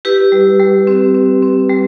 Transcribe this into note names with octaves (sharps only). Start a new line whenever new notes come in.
E4 G4 B4
G3
G3
C4
C4
C4
G3